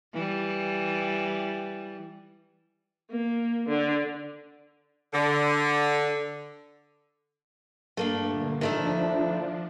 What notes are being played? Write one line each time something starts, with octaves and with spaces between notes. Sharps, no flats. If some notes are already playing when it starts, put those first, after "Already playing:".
E3 G3
A#3
D3
D3
G2 A3 A#3 D4
A#2 D3
D#3 F3 A3 D4 E4